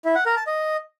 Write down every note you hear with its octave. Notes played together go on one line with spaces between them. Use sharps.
E4
F#5
A#4
A5
D#5